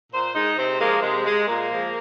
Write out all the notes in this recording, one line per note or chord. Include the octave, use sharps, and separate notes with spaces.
A#2 C5
G#3 D#4
C3 C4
F3 G#3 A#3
C3 G#3
G#3
A#2 A#3
F3 G#3